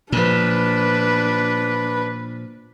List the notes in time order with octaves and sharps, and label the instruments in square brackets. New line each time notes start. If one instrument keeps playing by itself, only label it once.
[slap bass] A#2 F3 [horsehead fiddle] D4 B4